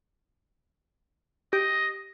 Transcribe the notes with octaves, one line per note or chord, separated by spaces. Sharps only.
G4 D#5